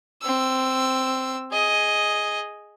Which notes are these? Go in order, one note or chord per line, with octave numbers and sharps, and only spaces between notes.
C4 E6
G#4 D#5